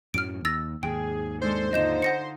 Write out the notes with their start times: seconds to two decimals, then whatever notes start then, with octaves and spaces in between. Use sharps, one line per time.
0.14 F#2 A2 F#3 F6 D7
0.45 D#2 E6 A6 A#6
0.83 D#2 G#2 G#4 G5
1.41 G#3 D4 A4 C5
1.73 D3 D#4 F4 D#5 G6 E7
2.02 F#5 A#6 C#7